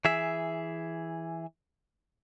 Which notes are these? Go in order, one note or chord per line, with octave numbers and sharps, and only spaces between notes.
E3 G#4 E5